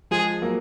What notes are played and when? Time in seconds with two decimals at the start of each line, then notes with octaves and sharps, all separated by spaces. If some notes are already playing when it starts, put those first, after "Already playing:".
0.11 F3 G#3 G#4
0.42 F#3 A#3